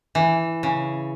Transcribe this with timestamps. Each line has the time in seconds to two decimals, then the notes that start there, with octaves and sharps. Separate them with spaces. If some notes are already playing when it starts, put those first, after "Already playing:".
0.15 E3
0.63 C#3